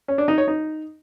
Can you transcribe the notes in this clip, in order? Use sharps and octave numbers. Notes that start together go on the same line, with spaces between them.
C#4
D4
D#4
C#5
D#4